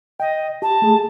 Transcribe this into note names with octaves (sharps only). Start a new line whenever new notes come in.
D#5 G5
G4 A5
A3 G#4